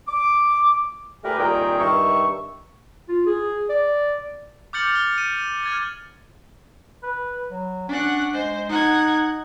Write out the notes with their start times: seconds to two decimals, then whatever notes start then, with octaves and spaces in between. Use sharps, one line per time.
0.07 D6
1.24 A3 G4 G#4 A#4 B4
1.38 C2 A#2 D#3 G#4 A#4 G5
1.80 G2 D#3 E5 C#6
3.09 F4
3.26 G#4
3.69 D5
4.73 D6 F6 G6 A6 C#7 F#7
4.93 F6 G7
5.18 D#7
5.63 F6 G#6 A6
7.03 B4
7.51 F#3
7.89 C#4 D4 F#5
8.33 G#3 C5
8.69 D#4 F#5 G#6